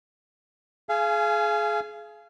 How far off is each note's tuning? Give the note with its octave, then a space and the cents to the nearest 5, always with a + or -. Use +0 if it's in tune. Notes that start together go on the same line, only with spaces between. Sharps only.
G#4 +25 F5 -25 G#5 +5